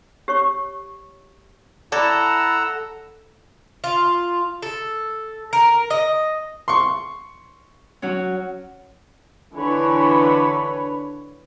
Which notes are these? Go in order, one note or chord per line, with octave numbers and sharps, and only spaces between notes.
G4 C#5 C#6
E4 A4 D5 F#5 A#5 D6 E6
F4
A4
A#4
D#5
C6 C#6
F#3 C#4
D3 E3 D4 B4 C#5 B5